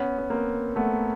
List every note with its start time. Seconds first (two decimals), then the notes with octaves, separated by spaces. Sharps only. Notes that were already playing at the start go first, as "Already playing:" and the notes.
Already playing: B3 C#4
0.18 B3
0.30 A#3 C4
0.76 A3 B3